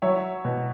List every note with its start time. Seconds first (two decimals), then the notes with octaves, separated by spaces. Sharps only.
0.02 F#3 C#5 E5
0.45 B2